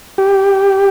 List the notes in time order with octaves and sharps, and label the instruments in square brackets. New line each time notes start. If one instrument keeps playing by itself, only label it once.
[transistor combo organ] G4